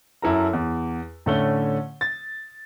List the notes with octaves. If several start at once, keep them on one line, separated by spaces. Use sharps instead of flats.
F#2 E4 A4 A#5
E2
A2 D3 A3 C#4 G7
A6